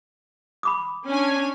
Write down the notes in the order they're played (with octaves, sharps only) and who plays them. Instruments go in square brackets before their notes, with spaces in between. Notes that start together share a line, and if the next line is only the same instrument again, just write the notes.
[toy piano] B5 D6 D#6
[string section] C#4 D4 G#5